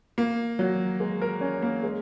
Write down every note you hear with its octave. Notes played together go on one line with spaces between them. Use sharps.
A#3
F#3
G#3
A#4
C#4
A#3
G#3